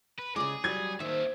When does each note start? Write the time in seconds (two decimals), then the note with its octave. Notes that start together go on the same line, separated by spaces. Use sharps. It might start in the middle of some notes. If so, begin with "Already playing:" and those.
0.19 B4
0.36 C#3 G#3 G#4 D6
0.64 F#3 G3 G#6
1.00 D#3 A#3 C5 E5